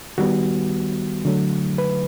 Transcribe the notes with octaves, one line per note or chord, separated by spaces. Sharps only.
D#3 G3 B3 F#4
D3 F#3 A3
B4